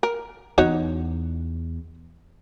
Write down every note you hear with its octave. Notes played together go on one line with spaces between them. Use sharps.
A#4
E2 D#4 F#4 C#5